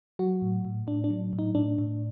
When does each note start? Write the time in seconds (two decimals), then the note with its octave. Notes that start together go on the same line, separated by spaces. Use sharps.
0.19 F#3 F#4
0.42 A2
0.65 A2
0.87 A2 D4
1.04 D4
1.10 F#3
1.33 A2
1.39 D#4
1.55 A2 D4
1.78 A2